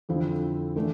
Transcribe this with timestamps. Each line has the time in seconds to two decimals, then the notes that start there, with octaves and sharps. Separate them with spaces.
0.09 F2 D3 F3 C4 E4
0.76 E3 A3 D4